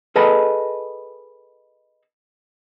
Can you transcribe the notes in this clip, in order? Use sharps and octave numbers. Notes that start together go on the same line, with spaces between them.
G#4 A4 B4 D#5 A5